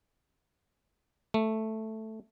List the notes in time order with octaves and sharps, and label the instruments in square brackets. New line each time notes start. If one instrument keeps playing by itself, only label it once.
[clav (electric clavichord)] A3